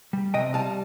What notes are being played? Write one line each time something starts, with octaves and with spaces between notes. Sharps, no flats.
G3
C3 D#5 G5
G3 F5 A5